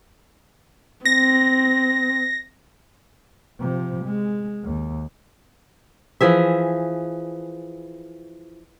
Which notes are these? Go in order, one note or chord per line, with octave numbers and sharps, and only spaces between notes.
C4 A#6
C3 F3
G#3
D#2
E3 F3 G#4 E5